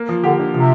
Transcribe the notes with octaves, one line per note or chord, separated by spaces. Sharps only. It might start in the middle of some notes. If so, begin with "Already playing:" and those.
Already playing: A#3
F3
D3 G4
D3
C3 F3